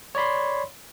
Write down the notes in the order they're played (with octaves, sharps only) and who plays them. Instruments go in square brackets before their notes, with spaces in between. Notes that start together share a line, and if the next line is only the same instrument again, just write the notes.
[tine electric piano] C#5 D5 B5 C6